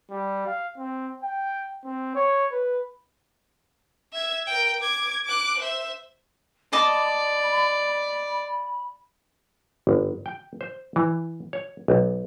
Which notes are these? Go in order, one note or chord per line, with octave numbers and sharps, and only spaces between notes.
G3
F5
C4
G5
C4
C#5
B4
E5 G#6
A#4 G5
D6 G#6
D6 F#6
C5 E5
D5 D#5 A5 B5 D6
G1
G5
C5
E3
C#5
B1